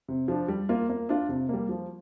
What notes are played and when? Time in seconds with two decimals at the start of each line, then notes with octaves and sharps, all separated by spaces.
0.08 C3
0.28 F3 D4
0.48 G3
0.69 A#3 F4
0.89 A#3
1.09 D4 F4
1.29 C3
1.49 G3 A#3
1.69 F3